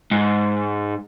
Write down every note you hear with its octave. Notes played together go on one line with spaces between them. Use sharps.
G#2